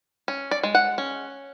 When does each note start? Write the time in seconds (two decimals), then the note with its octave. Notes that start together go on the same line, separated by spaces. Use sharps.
0.28 C#4
0.51 D5
0.63 G#3
0.75 F#5
0.98 C#4